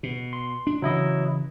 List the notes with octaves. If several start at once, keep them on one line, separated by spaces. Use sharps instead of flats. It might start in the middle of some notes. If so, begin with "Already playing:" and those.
B2
C6
D4
C#3 E3 F#3 E4 D#5